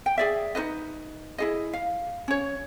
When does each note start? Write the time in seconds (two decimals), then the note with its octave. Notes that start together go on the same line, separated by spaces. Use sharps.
0.06 G5
0.18 G#4 D5 E5
0.55 D#4 G#4 B4 D#5
1.38 E4 G#4 D#5
1.73 F5
2.28 C#4 C#5